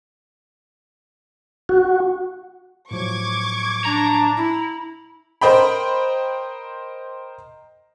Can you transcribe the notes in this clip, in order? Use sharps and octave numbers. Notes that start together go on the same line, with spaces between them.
F#4
A2 F3 F#3 C#6 D6 G#6
D4 A#5
E4
A#4 C5 D#5 G5 B5